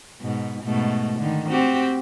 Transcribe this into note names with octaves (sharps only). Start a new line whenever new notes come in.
G#2 B2
G#2 B2 A3
D3 D#3
C4 F#4 G4